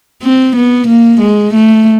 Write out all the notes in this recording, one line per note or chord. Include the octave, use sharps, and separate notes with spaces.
C4
B3
A#3
G#3
A3